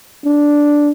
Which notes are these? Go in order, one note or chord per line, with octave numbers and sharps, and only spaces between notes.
D4